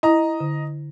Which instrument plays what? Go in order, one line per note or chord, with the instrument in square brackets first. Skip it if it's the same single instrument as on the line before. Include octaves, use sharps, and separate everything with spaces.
[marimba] E4 [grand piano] D#5 A#5
[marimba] D3